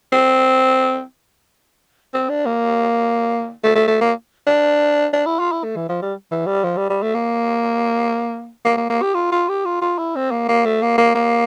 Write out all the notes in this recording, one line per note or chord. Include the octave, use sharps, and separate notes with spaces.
C4
C4
D4
A#3
A3
A3
A3
A#3
D4
D4
E4
F4
E4
A3
E3
F3
G3
E3
G3
F3
G3
G3
A3
A#3
A#3
A#3
A#3
G4
F4
F4
G4
F4
F4
E4
C4
A#3
A#3
A3
A#3
A#3
A#3